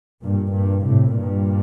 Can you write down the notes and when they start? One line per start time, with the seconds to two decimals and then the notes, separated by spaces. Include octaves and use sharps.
0.23 G2 A#2
0.53 G2 A#2
0.84 A2 C3
1.16 G2 A#2